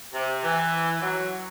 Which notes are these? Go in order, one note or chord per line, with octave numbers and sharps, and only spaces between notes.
C3
E3
F#3